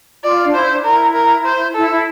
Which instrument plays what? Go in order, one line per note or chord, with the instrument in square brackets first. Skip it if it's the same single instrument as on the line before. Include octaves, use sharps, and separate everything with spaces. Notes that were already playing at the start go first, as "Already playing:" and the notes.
[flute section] F4 [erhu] D5
[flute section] D4
[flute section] E4 [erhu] C5
[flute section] D4
[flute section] E4 [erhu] A#4
[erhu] A#4
C5
[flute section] E4 [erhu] A4
[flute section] E4